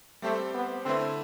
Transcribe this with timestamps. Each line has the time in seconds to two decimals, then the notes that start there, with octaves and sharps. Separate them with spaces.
0.22 G3 A3 C4 G4 C5
0.54 B3
0.85 D3 A3 C4 E4 B4 E5